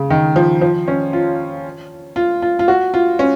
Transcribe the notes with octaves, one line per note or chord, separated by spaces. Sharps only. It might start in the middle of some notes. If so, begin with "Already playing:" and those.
Already playing: C#3
D#3
F3
F3
C#4
F4
F4
F4
F4
F#4
F4
C#4